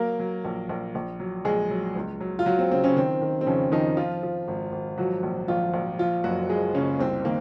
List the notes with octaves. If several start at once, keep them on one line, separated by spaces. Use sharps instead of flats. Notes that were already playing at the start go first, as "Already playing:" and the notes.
Already playing: F#3 A#3 A#4
F#3
A#1
A#1
A#1
F#3
A#1 G#3 G#4
F#3
C#2
F#3
F4
F#3 F#4
C4
C#3 C4
C#3 C#4
D#3 C4
D#3
C4
F2 C#3 C#4
F2 D#3 D#4
F3 F4
F3
G#1
G#1
F3 F#3 F#4
A#1
A#1 F3 F4
A#1
F3 F4
F#1 F#3 F#4
F3 G#3 G#4
F#1 C#3 C#4
C2 C4
D#3 A#3